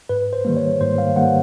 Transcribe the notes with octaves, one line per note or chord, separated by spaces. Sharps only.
G#2 B4
C5
D#3 G3 A#3
C#5
G#2 C5
F5
D#3 G3 A#3 F#5